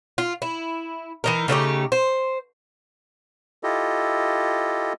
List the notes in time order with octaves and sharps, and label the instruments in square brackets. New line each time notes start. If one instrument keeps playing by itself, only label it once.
[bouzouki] F4
E4
E3 D#4 A#4
C#3 A3 D#4 G4
C5
[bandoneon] E4 F4 G4 A4 D#5